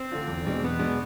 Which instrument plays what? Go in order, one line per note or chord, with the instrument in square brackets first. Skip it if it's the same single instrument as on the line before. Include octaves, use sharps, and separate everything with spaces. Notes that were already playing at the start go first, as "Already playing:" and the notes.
Already playing: [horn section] C4
[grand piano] D3 A3 D4 F4
E2
B2 G#3 D4
[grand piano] E2 [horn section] B3
[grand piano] B2 G#3 D4